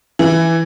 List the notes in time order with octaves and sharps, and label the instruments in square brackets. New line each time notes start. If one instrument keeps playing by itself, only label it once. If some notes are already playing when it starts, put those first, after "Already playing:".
[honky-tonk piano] E3